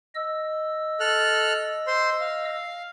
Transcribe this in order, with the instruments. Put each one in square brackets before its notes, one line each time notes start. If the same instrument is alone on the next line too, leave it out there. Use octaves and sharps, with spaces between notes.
[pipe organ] D#5 E6
[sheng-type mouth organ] A4 F6 F#6
C5 C6
F5